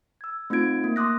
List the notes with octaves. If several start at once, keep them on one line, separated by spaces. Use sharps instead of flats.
E6 G#6
A3 C4 D#4 F4 G#6 D7
A#3
C6 D6 D#6 F#6 A#6